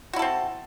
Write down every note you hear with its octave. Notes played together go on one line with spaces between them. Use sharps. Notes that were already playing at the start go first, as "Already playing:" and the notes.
C4 E4 F#4 A4